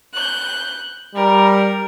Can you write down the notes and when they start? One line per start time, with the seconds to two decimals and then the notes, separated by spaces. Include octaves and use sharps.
0.13 F#6 G6
1.15 G3 A#4